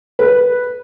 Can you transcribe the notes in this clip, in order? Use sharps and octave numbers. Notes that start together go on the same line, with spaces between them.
B4